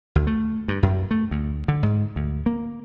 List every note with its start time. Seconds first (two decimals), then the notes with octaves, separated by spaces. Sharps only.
0.15 D2
0.27 A3
0.68 G2
0.83 F#2
1.11 A3
1.31 D2
1.68 D3
1.83 G#2
2.16 D2
2.46 A#3